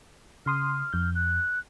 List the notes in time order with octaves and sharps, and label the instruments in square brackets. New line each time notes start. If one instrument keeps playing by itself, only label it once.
[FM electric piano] C#3 C6 D#6 [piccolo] F6
[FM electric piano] F2 G6
[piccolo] F#6